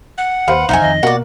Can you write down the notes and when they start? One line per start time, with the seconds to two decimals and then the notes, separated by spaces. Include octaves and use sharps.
0.18 F#5
0.48 D#2 B4 C5 F5
0.69 B1 F2 D#4 E5 F#5 G#5
0.81 F2 D#3 D#5
1.03 B2 A#3 F#4 D5